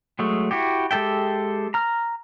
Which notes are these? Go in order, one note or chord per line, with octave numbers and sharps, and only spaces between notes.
F#3 G#3 A3
E4 F#4 G4
G#3 G4 A4 E5 G5
A#5 F6